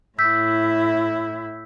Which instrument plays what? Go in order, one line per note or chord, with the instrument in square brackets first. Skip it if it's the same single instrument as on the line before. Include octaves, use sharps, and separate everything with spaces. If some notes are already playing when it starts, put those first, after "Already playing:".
[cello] A2 E4 [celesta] E6 G6 B6